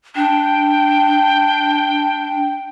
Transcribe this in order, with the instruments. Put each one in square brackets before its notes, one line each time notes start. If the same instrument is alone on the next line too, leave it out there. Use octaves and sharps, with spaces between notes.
[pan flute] D4 [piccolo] G5